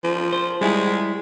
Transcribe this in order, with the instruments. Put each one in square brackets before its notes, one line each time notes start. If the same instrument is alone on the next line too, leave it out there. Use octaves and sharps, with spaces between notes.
[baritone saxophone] F3
[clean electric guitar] C5
[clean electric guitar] G3 E4 G#4 [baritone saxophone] G#3